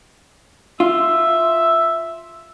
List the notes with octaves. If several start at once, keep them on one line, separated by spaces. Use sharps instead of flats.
F4 E5